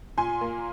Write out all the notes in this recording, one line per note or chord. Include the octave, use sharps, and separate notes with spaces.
A#2 G#5 C6
A#3